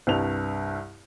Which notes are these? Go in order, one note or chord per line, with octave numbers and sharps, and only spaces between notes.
C2 G2 F7